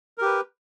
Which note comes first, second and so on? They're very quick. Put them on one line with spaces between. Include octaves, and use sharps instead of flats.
A#4 G4 B4